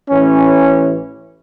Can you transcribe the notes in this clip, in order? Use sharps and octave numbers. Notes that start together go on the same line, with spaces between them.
A1 E3 C#4